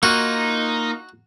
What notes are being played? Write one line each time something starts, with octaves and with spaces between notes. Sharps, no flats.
A#3 D#4 F4 F#4